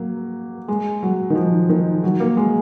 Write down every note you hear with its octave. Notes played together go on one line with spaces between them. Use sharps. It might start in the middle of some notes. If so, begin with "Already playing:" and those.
Already playing: F#3 A#3
G#3
F#3
D#3
F3
D#3
F#3
A#3
G#3